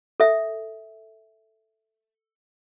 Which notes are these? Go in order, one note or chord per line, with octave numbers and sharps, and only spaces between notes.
A4 E5